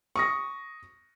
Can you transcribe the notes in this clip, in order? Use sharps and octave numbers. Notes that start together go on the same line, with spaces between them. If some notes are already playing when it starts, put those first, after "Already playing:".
C#6 D#6 A#6